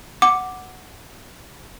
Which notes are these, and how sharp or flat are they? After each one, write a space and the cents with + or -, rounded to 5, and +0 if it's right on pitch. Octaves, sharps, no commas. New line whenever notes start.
F#5 +0 D6 +0